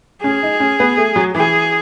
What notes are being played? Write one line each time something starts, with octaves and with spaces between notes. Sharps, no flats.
C#4 G#4
D#4
C#4
B3
A3
F#3
E3 G#4